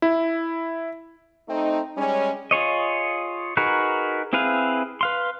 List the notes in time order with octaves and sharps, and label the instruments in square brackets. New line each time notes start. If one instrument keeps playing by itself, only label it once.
[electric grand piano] E4
[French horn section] A3 C4 D#4
G3 G#3 C#4
[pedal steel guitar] F4 G#4 C#5 D#5
D#4 F#4 G#4 A#4 B4
C4 E4 G#4 B4 F5
B4 F5 C6